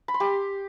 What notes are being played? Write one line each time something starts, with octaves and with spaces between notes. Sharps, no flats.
B5
C6
G4